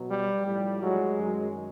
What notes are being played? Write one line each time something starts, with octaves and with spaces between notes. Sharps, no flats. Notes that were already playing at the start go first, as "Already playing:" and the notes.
Already playing: B2 F#3
G3
A2 F3 G3
F#3 G#3
F#2 D#3 F#3